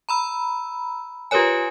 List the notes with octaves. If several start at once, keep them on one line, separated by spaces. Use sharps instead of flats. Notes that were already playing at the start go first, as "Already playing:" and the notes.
A#5 B5 E6
F4 G4 A#4 B4 C#5 G#5